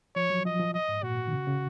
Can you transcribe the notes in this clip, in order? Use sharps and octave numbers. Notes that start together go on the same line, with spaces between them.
F3 C#5
F#3
F3 D#5
F3
D#5
G#2
A#2 F#4
D#3
C#3
C#3